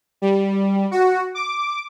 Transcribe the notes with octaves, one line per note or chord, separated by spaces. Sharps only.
G3
F#4
D6